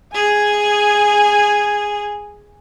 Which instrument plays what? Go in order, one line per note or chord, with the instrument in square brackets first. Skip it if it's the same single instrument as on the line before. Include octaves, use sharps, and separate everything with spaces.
[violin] G#4 [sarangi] G#5